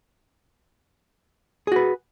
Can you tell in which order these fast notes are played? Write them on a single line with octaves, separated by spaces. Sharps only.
G#4 F#4 B4